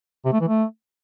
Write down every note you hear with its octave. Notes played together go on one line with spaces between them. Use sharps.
C3
A3
E3
A3